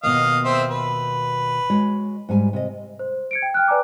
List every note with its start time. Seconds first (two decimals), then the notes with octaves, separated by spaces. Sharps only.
0.03 D#2 B2 D#5 F5
0.45 C4 E5 C6
0.69 B4
1.70 G#3 F#4 C#5
2.29 G#2 G3 G#5
2.53 C3 D#5
2.99 C5
3.31 G#6 C#7 D7
3.42 G5
3.54 G5 F6 F#6
3.68 B4 D5 G#5 A#5 D6